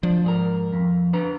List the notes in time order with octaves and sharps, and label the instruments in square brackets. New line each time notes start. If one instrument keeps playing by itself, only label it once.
[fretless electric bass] F3 [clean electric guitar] D4
[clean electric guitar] G#2 G#4 A#4
F2
D4 B4 A#5